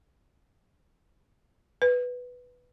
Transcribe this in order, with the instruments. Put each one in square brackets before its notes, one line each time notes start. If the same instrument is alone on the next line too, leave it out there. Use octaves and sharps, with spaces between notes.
[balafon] B4